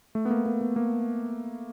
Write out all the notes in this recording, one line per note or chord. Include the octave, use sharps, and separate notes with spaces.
A3
B3
A#3
A#3
B3
A#3